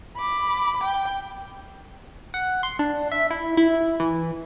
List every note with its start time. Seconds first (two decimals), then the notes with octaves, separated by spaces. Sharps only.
0.17 B5 D6
0.84 G5
2.34 F#5
2.63 C6
2.79 D4
3.12 E5
3.30 E4
3.57 E4
4.00 E3